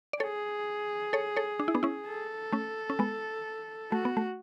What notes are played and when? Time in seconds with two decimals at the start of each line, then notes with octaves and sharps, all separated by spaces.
0.13 D5
0.20 G#4 A4 C#5
1.13 A4 C#5
1.36 A4 C#5
1.60 D4
1.68 E4
1.75 B3 D4
1.83 C#4 E4
2.07 A4
2.52 A3 C#4
2.90 C#4
2.99 G#3 B3
3.92 A3 F#4
4.05 B3
4.17 A3